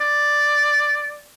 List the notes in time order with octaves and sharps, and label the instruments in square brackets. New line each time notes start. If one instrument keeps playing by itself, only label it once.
[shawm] D5